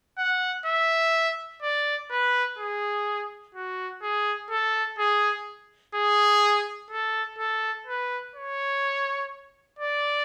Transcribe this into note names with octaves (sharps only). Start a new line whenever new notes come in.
F#5
E5
D5
B4
G#4
F#4
G#4
A4
G#4
G#4
A4
A4
B4
C#5
D5